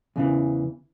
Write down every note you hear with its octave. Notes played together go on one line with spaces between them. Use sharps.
E2 C#3 E3